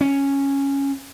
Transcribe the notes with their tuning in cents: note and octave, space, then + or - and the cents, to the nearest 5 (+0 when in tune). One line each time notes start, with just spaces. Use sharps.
C#4 -5